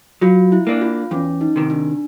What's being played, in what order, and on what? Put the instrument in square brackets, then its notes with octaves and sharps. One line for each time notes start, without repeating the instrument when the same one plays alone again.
[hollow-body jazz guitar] F#3 [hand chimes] F4
[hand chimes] E4
[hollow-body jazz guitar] A#3 D4
[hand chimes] F4
[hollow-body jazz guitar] E2 [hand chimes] C#4
[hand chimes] D#4
[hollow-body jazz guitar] C3 D#3
[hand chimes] D4